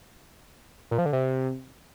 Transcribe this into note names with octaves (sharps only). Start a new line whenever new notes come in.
A#2
F3
D3
C3